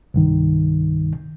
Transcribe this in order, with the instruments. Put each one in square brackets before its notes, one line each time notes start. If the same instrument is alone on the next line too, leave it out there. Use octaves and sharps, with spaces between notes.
[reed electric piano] C2 G2 D#3